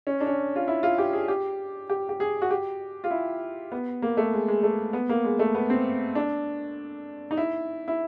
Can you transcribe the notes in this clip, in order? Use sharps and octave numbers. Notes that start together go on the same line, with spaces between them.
C#4
D4
C#4
F4
E4
F4
G4
G#4
G4
G4
G4
G#4
F#4
G4
F4
E4
B3
A#3
A3
G#3
G#3
A3
B3
A#3
G#3
A3
B3
C4
D4
D#4
E4
E4